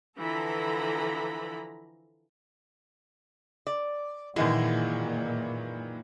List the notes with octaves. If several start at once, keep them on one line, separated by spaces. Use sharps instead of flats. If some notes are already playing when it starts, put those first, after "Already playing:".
D3 E3 F3 A4 A#5 B5
D5
F#2 A#2 D#3 E3 G#3 E4